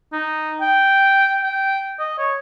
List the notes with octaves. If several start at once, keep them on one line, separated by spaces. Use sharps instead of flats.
D#4
G5
G5
D#5
C#5